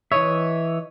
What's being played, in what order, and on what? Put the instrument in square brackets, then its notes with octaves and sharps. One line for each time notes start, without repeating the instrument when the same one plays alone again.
[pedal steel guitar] E3 D#5 E5 [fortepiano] C#5